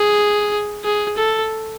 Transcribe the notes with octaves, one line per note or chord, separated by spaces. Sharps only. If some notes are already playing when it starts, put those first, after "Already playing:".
Already playing: G#4
G#4
A4